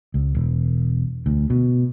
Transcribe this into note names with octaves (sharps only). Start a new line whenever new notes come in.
C#2
E1
D2
B2